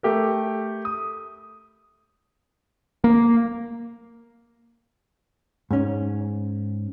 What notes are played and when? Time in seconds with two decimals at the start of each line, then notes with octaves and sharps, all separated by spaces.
0.03 A3 G4 A#4
0.85 D#6
3.04 A#3
5.71 G#2 C#4